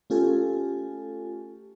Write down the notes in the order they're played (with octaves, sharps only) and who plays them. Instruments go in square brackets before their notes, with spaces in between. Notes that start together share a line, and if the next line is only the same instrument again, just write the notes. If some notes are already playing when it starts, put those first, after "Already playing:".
[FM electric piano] A3 C#4 F4 G4 A4 G#5